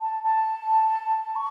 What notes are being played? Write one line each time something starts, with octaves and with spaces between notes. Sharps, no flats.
A5
A5
C#6